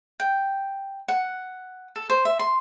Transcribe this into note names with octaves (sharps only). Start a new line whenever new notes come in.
G5
F#5
A4
C5
E5
C6